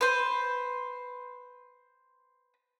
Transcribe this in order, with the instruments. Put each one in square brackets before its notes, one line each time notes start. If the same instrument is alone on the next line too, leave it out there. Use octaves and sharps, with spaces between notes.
[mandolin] B4 C5